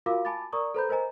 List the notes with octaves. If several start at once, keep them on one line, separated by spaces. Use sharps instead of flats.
F4 F#4 A#4 F5 D6
G#5 A5 B5 D6 A6
A#4 D5 A#5 C#6 D#6
A4 B4 C5 A#5 B5 G6
A#4 C5 D#5 G#5 A#5